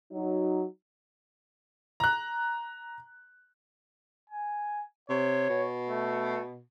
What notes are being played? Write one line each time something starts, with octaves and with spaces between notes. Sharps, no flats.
F#3 D#4
A#5 F#6
G#5
C3 C#5
B2
A3